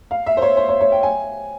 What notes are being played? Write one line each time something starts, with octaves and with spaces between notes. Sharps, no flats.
F5
E5
C5
C#5
C5
C#5
C#5
G5
G#5